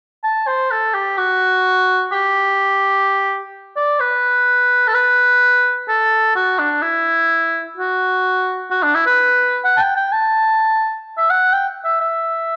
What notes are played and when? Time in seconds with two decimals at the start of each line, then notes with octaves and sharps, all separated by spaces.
0.24 A5
0.47 C5
0.71 A4
0.94 G4
1.18 F#4
2.12 G4
3.76 D5
4.00 B4
4.87 A4
4.94 B4
5.88 A4
6.35 F#4
6.59 D4
6.82 E4
7.77 F#4
8.71 F#4
8.83 D4
8.95 E4
9.06 B4
9.64 F#5
9.77 A5
9.80 G5
9.96 G5
10.12 A5
11.18 E5
11.30 F#5
11.53 G5
11.85 E5
12.01 E5